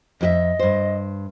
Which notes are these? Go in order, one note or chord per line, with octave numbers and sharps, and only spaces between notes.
F2 F#4 D#5 E5
G2 C5